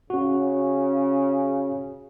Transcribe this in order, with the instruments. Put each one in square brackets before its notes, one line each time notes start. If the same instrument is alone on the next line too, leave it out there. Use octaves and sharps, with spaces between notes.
[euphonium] C#3 [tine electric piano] C#4 F#4